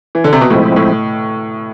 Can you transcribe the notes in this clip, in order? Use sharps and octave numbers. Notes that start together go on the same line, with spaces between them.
E3
D3
C3
B2
A2 F3 G#3 C4 E4
A2